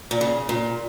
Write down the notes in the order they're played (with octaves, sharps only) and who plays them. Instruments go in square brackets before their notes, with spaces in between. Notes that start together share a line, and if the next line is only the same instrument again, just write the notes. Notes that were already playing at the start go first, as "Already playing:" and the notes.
[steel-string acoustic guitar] A#2
C#3
A#2